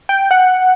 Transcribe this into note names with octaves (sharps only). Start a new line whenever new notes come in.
G5
F#5